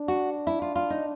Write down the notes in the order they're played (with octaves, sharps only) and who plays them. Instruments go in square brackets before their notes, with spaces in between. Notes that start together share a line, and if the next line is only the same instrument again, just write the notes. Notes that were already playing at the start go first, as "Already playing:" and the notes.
Already playing: [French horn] D4
[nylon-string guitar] F#4
E4
F4
F4
D#4